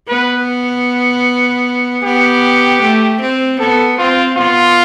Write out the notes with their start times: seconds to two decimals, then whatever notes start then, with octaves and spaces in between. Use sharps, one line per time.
0.09 B3 B4
2.04 B3 G4
2.82 A3
3.21 C4
3.60 B3 A4
3.99 C4 F4
4.38 B3 F4